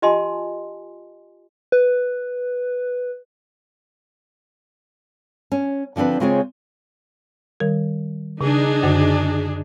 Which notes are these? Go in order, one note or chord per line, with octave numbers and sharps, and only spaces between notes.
F4 G4 D#5 G#5 A5 C6
B4
C#4
D3 F3 C4 D4 B4
C#3 G#3 C4 F4 G#4 C#5
D#3 G3 A#4
C#3 D4 D#4 G#4
F#2 D3 F#4